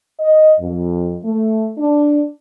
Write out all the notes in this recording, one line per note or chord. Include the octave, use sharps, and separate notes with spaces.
D#5
F2
A3
D4